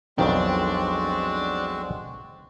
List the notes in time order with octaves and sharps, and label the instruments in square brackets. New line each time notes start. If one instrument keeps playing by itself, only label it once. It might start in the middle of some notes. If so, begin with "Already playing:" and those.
[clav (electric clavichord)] B1 F2 D#3 [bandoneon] G#3 C4 F#4 [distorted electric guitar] D4